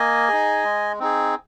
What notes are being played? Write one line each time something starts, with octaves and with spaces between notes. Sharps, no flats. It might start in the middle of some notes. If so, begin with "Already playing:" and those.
Already playing: A#3 D#5 G#5
D#4 G#4
G#3
C4 D#4 G#4